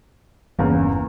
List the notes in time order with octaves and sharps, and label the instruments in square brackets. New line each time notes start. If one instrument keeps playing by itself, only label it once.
[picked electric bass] G1 G2 E3 [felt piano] E2 C#3 A#3